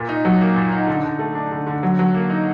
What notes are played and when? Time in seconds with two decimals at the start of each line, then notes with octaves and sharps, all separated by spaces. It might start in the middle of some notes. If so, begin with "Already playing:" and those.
Already playing: A#2
0.09 D#4
0.25 F#3
0.41 A#3
0.56 A#2
0.72 D#4
0.87 D3
1.04 D3
1.19 A3
1.35 D4
1.52 D3
1.67 D3
1.83 F#3
1.99 F#3
2.14 A#3
2.30 D#4